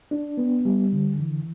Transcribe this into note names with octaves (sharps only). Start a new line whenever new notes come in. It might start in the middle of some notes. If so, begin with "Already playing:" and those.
D4
B3
G3
D3
E3